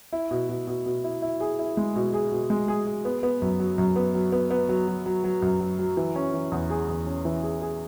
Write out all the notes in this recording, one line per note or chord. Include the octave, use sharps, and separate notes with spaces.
E4
B2
B2
B2
B2
E4
E4
G#4
E4
G#3
B2
G#4
B2
G#3
G#4
G#4
B3
B3
F#2
F#3
F#2
B3
F#3
B3
B3
F#3
F#3
F#3
F#3
F#2
F#3
F#3
E3
C#4
E3
E2
G#4
E2
C#4
E3
G#4
G#4